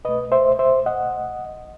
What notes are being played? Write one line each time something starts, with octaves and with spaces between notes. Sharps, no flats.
C2 B2 A3 B4 D#5
C5 E5
C5 E5
D#5 F#5